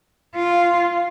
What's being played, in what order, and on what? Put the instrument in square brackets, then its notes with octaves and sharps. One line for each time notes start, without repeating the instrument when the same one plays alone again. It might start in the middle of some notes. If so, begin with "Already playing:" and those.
[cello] F4